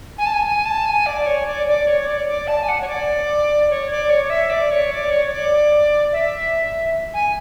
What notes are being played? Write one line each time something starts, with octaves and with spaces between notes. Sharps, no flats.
G#5
A5
G#5
G#5
A5
G#5
D5
C#5
D5
D5
C#5
D5
D5
A5
G#5
F#5
C#5
D5
C#5
D5
C#5
E5
D5
C#5
D5
C#5
D5
E5
G#5